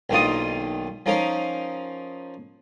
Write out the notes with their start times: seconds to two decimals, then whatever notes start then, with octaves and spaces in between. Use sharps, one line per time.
0.10 B1 D#3 A#3 D4 F4 D#6
1.06 F3 C#4 D#4 A#4 F5